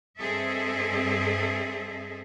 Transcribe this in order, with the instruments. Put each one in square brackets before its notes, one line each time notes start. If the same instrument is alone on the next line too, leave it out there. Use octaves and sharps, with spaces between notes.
[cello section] G2 C4 G#4 A4 D#5 E5